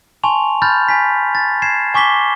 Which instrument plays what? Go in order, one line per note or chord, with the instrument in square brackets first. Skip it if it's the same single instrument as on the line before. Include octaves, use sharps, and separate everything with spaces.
[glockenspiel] G#5 A5 C6 C#6 F7
B5 F6 G6 A6
G#5 B6
A6
G#6 C7 E7
G#5 C#6 D6 B6 G7